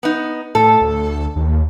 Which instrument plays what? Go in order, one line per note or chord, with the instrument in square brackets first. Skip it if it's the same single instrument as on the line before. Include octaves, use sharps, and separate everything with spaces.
[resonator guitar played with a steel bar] B3 D#4
[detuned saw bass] A2 [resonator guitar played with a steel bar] A4
[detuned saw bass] D2
D#2